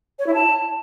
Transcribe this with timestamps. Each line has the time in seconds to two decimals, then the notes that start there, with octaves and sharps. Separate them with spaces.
0.19 C#5
0.27 E4
0.34 A5